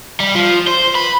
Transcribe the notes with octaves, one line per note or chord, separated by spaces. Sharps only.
G3
F3
C5
B4